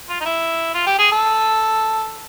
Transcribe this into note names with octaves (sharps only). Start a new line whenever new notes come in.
F4
D#4
E4
F4
G4
G#4
A4